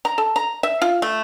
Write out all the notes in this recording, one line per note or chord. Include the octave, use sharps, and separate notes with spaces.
A#5
A4
A#5
E5
F4
A3